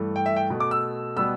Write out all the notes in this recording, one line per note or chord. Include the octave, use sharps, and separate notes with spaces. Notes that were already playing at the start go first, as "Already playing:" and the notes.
Already playing: G2 E3 A3
G5
E5
G5
B2 A3
D6
E6
B2 G3 B3 E6